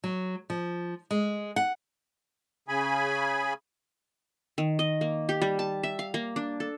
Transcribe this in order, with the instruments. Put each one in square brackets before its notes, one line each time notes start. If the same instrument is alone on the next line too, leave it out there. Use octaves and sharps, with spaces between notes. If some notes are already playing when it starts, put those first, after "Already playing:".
[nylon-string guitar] F#3
F3
G#3
F#5
[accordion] C#3 G#4 G#5 B5
[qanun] D#3
D#5
A#3
G4
G3
A5
E5
F5
A#3
D4
A4